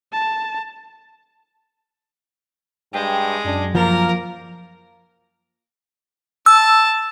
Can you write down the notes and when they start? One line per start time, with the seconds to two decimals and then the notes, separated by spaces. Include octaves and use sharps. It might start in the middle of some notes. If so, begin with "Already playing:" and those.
0.13 A5
2.93 G2 G#3 G5
3.44 F#2 D4
3.75 F3 A#3 A#4
6.46 A5 E6